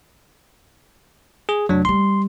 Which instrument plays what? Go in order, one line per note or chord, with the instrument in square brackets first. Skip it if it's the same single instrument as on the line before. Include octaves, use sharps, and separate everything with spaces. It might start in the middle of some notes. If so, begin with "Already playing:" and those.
[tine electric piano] G#4
[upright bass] F1 [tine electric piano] F#3 D4
[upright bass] F3 G3 [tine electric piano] C6